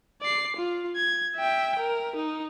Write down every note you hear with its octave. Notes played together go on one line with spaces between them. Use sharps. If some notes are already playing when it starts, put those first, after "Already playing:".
D5 C7
F4
G#6
E5 G5
A#4
D#4